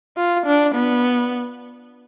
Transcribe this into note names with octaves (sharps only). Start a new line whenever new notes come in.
F4
D4
B3